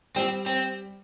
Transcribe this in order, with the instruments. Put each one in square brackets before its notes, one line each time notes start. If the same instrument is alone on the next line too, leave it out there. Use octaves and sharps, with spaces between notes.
[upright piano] G3 [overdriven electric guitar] C4
[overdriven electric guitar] C4